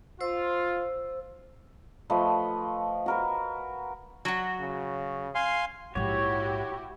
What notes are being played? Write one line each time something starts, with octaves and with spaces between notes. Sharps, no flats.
F4 C5 E6
F3 A3 B4 D#5
F#4 A#4 B4
F#3 F#4
C#3
F5 G#5 C6
A#1 G#2 E4 F#4 G4 C#5